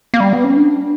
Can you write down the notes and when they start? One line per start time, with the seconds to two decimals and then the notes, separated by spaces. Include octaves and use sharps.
0.14 A#3
0.20 G3
0.33 B3
0.44 C#4
0.57 D4